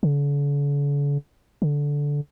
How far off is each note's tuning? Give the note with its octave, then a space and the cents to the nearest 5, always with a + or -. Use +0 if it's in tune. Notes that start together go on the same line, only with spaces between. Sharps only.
D3 -45
D3 -15